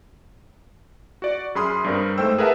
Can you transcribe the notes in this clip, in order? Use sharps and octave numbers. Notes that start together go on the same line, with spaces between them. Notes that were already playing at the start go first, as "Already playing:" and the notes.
F#4 D5
F#2 G#4 B5 C6 D#6 F6
G2 G3 C4 A#4
G#2 A3 C5 G5 E6
G#4 A#4 B4 E5 F#5 A5